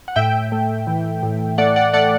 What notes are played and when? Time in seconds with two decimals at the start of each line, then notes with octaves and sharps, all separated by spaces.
0.08 F#5
0.16 A2 E5 G5
0.52 A3
0.87 E3
1.23 A2
1.58 A3 D5 F#5
1.76 D5 F#5
1.93 A3 D5 F#5